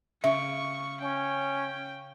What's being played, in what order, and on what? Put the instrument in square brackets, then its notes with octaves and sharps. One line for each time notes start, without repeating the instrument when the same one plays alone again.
[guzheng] C#3 [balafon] E5 [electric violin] C#6
[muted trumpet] C#4 [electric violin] G5